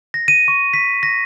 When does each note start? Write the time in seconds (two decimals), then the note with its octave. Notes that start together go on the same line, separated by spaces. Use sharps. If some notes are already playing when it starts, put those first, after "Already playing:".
0.14 A#6
0.28 D#7
0.48 C#6
0.74 B6
1.03 A#6